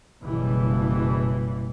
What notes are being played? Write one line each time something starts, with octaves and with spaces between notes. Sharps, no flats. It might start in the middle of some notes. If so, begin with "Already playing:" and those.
F#1 B2 E3 G3